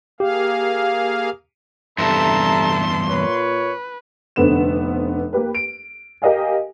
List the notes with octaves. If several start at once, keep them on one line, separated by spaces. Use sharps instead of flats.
A#3 G4 G#4 F5
E2 G2 C3 A4 E5 A5 A#5 C6
A#2 B4 C#5
F1 D3 B3 C4 E7
A#3 G4 B4
D7
G4 A#4 D#5 F5 G#5